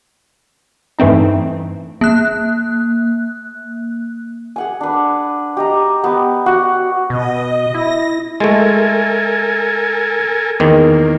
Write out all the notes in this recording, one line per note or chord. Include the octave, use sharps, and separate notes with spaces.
G2 E3 A3 C4 D#4
A#3 F#6
G#4 F#5 G#5
D4 B4
G4 D#5 A#5
B3 G4
F#4 F#5
B2 D#5
E4 A#6
G#3 A3 A4 A#4 G#5
E2 D#3 A#3